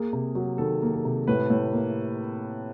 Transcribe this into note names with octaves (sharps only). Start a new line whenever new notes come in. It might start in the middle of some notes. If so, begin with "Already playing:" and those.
Already playing: A#3 G#4
C3
F#3
D#3 A4
A#3
A4
C3
A2 B4
A2
A#3